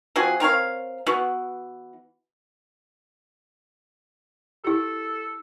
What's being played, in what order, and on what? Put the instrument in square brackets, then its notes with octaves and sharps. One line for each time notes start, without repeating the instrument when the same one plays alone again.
[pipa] F3 C4 F#4 G#4
C4 A#4 C#5 F5
E3 B3 F#4
[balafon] E4 G4 [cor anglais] A4